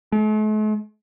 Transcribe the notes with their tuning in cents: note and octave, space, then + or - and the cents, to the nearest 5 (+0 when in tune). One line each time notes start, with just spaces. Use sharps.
A3 -45